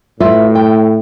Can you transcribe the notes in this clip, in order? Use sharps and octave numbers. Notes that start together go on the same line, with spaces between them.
A2 F4 B4 E5
G5